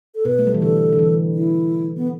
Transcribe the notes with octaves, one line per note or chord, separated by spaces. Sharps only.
A4
B2 B4
A3
G3
E3
D3 A4
D3
E3
E4
B3